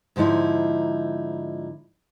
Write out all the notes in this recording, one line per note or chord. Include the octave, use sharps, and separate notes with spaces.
G#2 D3 F3 D#4 E4